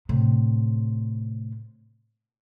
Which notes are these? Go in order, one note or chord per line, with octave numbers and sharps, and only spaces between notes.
A2 C3